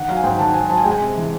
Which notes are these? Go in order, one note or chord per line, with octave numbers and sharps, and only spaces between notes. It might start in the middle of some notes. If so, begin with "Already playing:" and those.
Already playing: D#3 F#5
F#3 F5
G#5
G#2 G5
D#3 A5
D#3 G#5
F#3 A5
G#5
G#3 G5
G#5
C3
E3